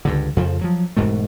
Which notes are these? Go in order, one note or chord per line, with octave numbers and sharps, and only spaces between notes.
C#2 G2 D3
F2 C#3 F3
F3 F#3
E1 G#2 B2 A3